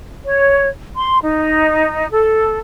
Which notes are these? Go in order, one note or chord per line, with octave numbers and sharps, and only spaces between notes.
C#5
C6
D#4
A4